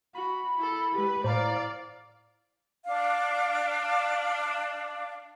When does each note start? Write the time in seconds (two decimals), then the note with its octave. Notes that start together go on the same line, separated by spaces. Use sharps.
0.15 F#4 B5
0.57 E4 A4
0.95 G#3 G4 B4
1.24 A2 C5 D5 F5 A#5
2.85 D4 F5